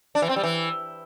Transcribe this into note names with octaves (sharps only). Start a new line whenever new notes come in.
D4
E3
C4
G3
E3